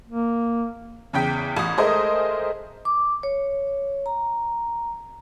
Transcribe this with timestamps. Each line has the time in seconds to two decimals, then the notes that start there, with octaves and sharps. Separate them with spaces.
0.07 A#3
1.13 E2 C#3 G5 B6
1.57 A1 D#6
1.78 G#3 A3 G#4 A#4 C5 D#5
2.85 D6
3.23 C#5
4.06 A#5